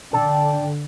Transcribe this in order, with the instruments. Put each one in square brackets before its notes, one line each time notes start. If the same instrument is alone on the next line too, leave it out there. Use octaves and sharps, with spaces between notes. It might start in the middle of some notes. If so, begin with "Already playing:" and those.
[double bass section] D3 [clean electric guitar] A4 [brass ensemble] D5 G5